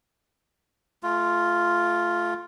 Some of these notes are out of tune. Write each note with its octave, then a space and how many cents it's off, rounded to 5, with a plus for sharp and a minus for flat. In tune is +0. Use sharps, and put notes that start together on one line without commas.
A3 -25 F4 +0